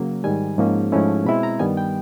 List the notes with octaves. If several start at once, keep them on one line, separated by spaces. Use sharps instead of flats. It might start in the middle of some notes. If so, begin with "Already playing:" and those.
Already playing: C#3 F#3 A#3
G#2 D#3 G3 G#5
G#2 F3 A#3 C#4
G#2 F3 A3 C#4 E4
B2 G#3 C4 E4 B5
A#5
G2 D#3 G3 B3 G#5
G5